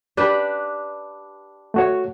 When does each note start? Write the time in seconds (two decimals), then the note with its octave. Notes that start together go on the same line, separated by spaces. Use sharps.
0.17 D4 G4 B4
1.74 A3 F#4 C#5